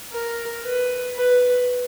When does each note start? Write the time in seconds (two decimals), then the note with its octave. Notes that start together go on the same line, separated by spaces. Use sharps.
0.12 A#4
0.64 B4
1.15 B4